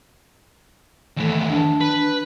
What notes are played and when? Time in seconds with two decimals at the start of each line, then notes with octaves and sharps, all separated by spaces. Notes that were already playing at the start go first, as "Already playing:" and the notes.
1.17 D#2 E3 A3
1.49 D4
1.81 B4